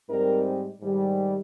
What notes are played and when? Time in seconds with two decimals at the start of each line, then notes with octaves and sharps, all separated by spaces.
0.09 G#2 G3 C4 D#4 A#4
0.80 G#2 D#3 G3